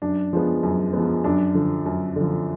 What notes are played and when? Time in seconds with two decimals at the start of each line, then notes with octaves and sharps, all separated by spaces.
0.02 F#2 D4
0.33 F3 G#3 B3
0.63 F#2
0.93 F3 G#3 B3
1.24 F#2 D4
1.55 D3 F3
1.86 F#2
2.16 D3 F3